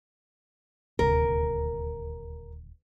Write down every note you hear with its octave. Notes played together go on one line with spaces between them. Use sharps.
D#1 D2 C3 A#4